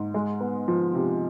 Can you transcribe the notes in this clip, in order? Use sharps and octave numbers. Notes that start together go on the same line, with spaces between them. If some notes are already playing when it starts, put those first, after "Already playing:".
Already playing: G#2
G#3
B3
F3
C3